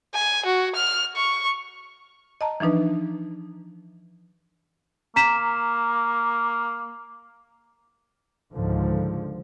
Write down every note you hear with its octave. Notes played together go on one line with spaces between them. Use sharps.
G#5
F#4
F6
C#6
D#5 A5 A#5
E3 F3 D4 D#4 B4
A#3 A#5 B6 E7
C#2 G#2 D3 F3